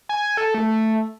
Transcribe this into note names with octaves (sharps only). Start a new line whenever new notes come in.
G#5
A4
A3